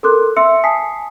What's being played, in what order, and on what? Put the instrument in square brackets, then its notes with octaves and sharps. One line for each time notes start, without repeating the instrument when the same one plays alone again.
[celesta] A4 A#4 C6 D6 F#6
E5 C6 E6 C#7
G#5 A5 D#6 B6 C7